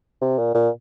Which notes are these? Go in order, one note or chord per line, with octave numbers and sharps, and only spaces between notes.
C3
A#2
A#2